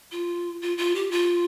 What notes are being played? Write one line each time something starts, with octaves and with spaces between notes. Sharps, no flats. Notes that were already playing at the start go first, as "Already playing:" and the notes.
F4
F4
F4
G4
F4